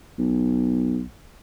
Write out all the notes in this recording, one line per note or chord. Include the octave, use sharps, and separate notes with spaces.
B1